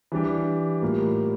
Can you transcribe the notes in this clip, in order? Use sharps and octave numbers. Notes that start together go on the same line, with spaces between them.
E3 G3 D4 G4
A2 G3 A#3 F4